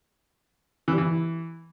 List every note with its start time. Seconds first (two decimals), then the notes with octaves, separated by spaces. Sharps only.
0.88 E3
0.93 G3
0.98 E3